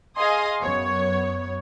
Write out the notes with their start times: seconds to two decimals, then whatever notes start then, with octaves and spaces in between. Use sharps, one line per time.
0.18 G#4 D#5 F5 G#5 C6 D#6
0.61 F#2 B3 C#5